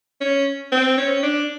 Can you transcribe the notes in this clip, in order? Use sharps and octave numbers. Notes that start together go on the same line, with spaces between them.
C#4
C4
C#4
D4